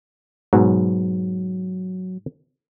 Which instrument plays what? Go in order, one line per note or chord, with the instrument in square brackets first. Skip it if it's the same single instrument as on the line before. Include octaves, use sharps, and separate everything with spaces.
[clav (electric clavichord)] G#2 B2 [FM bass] F#3